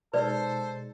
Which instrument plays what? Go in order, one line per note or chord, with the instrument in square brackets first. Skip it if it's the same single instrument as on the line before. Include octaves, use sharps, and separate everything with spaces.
[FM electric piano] B2 G#3 D#4 [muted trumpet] A4 [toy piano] B4 D5 [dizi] C5